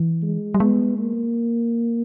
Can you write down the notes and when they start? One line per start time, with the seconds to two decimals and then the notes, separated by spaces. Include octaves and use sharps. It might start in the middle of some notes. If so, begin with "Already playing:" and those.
Already playing: E3
0.23 G#3
0.54 G3
0.60 G#3 B3
0.99 A#3